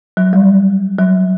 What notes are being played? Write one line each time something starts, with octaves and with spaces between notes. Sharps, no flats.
F#3
G3
F#3